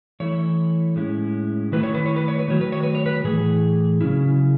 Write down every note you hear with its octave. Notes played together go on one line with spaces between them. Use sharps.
E3 A3 E4 C#5
A2 G#3 C#4 E4
D#3 A3 E4 B4
C#5
B4
C#5
B4
C#5
B4
D#3 F#3 A3 C#5
B4
C#5
B4
C#5
B4
A2 E3 A3 G#4
C#3 F#3 C#4 E4